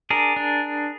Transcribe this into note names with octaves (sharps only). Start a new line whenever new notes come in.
D4 G#4 A#4
D4